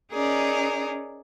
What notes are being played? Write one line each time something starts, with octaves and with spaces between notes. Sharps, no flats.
C#4 D#4 G#4 A#4 D5